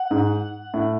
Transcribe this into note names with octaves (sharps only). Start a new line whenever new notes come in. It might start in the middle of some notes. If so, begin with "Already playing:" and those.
Already playing: F#5
G#2
A2